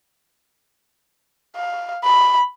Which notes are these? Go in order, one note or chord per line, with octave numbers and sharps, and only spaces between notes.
F5
B5